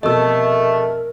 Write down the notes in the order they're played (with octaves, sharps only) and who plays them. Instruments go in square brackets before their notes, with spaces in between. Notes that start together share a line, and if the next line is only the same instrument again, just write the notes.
[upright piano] F1 B2 [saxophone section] A3 [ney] A#4 [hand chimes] D#5 E6